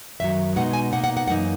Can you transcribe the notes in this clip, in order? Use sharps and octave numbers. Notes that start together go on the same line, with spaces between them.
F#2 D#3 F#3 E5
B2 G#3 B3 D#4 F#5
G#5
B2 A#3 D#4 F#5
F#5
F#5
F#2 E3 A#3 D#4 F#5